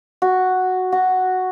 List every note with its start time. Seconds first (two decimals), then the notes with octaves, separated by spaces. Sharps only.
0.22 F#4
0.92 F#4